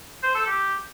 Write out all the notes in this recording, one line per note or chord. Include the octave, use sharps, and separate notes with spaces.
C5
A4
G4